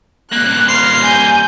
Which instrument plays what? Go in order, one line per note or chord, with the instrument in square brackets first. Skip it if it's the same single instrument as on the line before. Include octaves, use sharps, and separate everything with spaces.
[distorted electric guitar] G3 A#3 [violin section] F#6
[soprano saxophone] C6 [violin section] F6
[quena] G#5 [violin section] G6